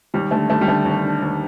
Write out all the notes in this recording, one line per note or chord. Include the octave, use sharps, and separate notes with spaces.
D#2 G3
D3 A3
D#2 A3
G3
D3 A3
D#2
D3
D#2